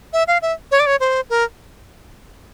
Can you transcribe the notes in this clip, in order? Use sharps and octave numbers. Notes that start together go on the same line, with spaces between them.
E5
F5
E5
C#5
D5
C#5
C5
A#4